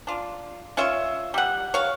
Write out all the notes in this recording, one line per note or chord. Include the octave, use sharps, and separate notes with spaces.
D4 F4
C#4 F4 C#5 E5
G3 F#5
C#5 F5